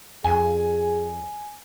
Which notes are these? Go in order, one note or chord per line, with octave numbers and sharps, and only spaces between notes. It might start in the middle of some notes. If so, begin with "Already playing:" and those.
F2 G#4 G#5